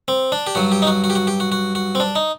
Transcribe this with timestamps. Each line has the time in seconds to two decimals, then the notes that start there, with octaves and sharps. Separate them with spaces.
0.08 C4
0.32 D4
0.47 G4
0.55 G2 F#3 F#4
0.72 G4
0.82 D#4
0.87 F#4
1.04 F#4
1.10 G4
1.15 F#4
1.27 G4
1.40 F#4
1.52 F#4
1.75 F#4
1.95 C4
2.00 D4
2.16 D#4